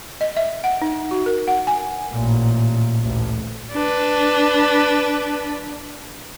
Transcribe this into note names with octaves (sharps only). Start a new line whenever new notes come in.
D#5
E5
F#5
D#4
F#4
A#4
F#5
G#5
A1 A#2
A1 D2
D4 B4